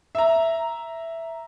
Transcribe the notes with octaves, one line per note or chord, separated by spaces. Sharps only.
E5 A#5